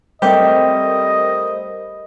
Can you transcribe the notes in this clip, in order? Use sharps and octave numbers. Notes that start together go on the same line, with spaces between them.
G3 A3 C4 G4 A#4 C5 D#5